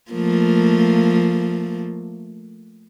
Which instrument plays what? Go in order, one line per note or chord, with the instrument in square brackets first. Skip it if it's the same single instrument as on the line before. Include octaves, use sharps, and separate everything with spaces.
[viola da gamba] F3 A3 A#3